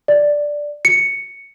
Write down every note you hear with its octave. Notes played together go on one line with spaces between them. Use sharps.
D5
C#7